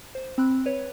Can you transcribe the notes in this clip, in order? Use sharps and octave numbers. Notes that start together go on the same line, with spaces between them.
C5
C4 B5 F#6
B4 C#5